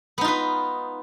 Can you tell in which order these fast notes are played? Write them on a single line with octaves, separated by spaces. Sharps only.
B3 D#4 F4 B4